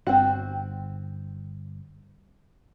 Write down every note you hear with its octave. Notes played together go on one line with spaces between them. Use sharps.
G1 C4 F#4